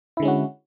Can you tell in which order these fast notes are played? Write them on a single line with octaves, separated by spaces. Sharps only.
E4 D3 G#3 C#4 F#4